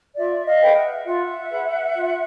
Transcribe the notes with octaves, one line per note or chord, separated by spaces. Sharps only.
F4 D5 E5
D#5 F5
G#4 B4 G5
E5 F#5
F4 E5 F#5
G#4 B4
F4